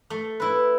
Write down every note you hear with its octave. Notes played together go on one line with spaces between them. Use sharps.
A3
E4 B4